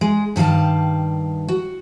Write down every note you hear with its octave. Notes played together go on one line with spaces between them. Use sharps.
G#3
G2 D#3 G3 F5 A5
F#4